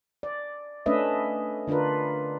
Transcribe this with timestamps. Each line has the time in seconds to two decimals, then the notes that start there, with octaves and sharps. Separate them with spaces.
0.23 D5
0.86 A3 C#4 D4 B4 D#5 E5
1.68 D3 D4 F4 A#4 B4